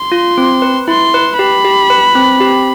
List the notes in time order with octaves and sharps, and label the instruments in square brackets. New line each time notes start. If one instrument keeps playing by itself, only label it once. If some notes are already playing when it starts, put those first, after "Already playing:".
Already playing: [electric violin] C6
[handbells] F4
C4
B4
[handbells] E4 [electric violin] C6
[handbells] B4
[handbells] G4 [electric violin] B5
[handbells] G4
B4
C4
G4